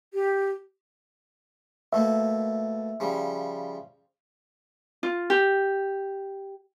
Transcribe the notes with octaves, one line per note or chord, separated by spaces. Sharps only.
G4
B2 A3 A#3 E5
C#3 F3 G3
F4
G4